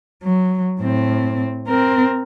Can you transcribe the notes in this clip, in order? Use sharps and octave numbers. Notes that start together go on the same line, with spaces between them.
F#3
A2 C4
C4 A#4